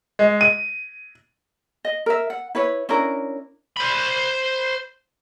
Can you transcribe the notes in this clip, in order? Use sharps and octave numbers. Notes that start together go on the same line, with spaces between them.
G#3
D#7
D#5
A#4 E5
F#5
E4 B4 C#5
C#4 D4 E4 A#4
C5 B5